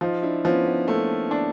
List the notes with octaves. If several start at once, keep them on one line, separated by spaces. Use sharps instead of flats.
F3 D#4 F4
D4 E4
F3 B3 C#4
B3
A3 A#3
D4